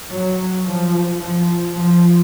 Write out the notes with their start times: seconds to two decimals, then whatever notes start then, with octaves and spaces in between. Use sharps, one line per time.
0.09 F#3
0.64 F3
1.21 F3
1.77 F3